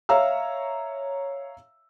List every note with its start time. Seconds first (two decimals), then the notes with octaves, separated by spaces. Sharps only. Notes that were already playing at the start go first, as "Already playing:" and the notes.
0.09 C#5 E5 F5 A#5 E6